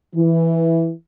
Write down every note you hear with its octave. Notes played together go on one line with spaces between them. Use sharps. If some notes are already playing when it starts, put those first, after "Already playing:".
E3